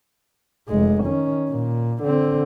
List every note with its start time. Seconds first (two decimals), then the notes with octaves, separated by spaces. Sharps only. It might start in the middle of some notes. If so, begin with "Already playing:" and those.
0.68 F1 G#3
1.04 D#3 C#4
1.50 A#2
2.03 D3 C4